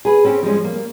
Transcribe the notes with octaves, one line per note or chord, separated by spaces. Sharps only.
G#4 B4
C4 C#4 G4 G#4
F3 G3 G#3 C#4
A#3